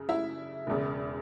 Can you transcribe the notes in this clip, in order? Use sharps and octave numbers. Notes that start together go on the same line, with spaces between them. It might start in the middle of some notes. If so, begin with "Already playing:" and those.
Already playing: F#2 C#3
E4 E5
E1 E2 C#3